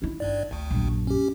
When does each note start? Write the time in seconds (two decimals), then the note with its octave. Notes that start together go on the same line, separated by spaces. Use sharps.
0.02 D#4 E4
0.20 G#1 G2 D5
0.51 G#1 D2
0.70 A#1 F#2
1.07 C#4 G4